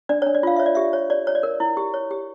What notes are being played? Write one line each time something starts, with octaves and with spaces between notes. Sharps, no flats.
D4 D5
C#5
D4
D5
F4 F5
C#5 E5
D5
G4 E5
C#5
C#5 D5
C#5
D5
A#4
E4
G4
C#5
G4